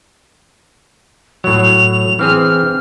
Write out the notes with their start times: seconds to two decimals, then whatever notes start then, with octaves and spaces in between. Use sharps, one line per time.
1.44 A2 F#3 F7
2.19 E3 C4 G#4 F6